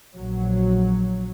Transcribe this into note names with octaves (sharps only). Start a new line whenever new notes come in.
A#1 F#3